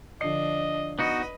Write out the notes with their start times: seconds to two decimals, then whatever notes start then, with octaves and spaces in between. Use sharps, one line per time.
0.21 D3 F3 D4 D#5 C7
0.99 B3 D#4 F#4 B4 D#5